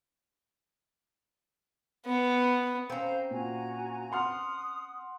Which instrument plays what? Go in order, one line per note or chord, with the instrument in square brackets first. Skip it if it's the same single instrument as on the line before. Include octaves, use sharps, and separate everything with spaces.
[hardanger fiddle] B3
[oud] C4 C#4 [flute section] F5 A#5 G6
[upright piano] A#2 [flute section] F#4 G#5 A#5
[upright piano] F#5 C6 F6 [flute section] D#6